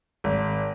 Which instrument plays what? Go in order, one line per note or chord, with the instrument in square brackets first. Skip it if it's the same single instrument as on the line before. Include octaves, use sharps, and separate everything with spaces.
[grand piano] G#1